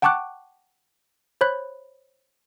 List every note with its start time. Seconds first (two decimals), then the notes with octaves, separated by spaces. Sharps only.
0.02 F#5 G5 A5 C#6 D6 F#6
1.41 C5 C#5 B5 F#6